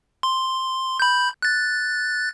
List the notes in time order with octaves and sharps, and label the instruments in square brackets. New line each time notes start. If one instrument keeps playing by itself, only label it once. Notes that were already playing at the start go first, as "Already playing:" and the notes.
[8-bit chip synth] C6
B5 G6
F#6 A6